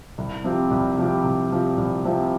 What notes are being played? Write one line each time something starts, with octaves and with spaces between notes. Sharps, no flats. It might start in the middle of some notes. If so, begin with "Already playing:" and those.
C2
C3 F3 C4 G4
C2
C3 F3 C4 G4
C2
C3 F3 C4 G4
C2
C3 F3 C4 G4